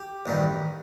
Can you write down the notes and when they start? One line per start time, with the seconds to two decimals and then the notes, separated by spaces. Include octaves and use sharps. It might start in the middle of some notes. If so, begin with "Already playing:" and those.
Already playing: G4
0.26 A1 G2 D#3 G3